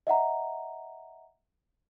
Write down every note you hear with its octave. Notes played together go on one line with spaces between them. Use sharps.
D#5 E5 F#5 A#5